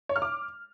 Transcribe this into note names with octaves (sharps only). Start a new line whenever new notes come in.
C#5
F6
D6